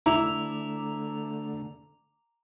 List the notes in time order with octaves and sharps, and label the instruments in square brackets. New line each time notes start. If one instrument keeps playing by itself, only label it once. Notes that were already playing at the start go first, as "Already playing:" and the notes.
[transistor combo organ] D3 A3 [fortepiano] E4 [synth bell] A#5 D6 F7